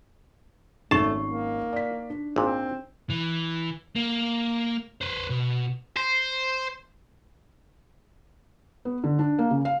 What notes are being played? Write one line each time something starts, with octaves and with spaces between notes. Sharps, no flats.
G#1 A3 C#4 D#4 A5 C#6 C7
A#3
D5 B6
D4
G#1 A#2 C4
E3
A#3
B4 C5
B2
C5
B3
D3
D4
A#3
C#3
F5